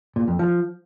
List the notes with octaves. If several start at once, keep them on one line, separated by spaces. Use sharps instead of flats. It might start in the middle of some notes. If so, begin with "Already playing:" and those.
A#2
F2
F3